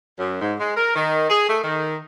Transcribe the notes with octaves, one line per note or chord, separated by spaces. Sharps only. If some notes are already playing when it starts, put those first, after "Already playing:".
F#2
G#2
G#3
A#4
D#3
G#4
A3
D#3